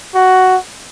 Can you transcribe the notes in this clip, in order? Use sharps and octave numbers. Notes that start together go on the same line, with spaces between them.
F#4